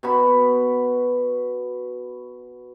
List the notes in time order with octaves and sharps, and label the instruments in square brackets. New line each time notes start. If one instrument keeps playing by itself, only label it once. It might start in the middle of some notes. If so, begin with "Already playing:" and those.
[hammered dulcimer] B2 F#4 B5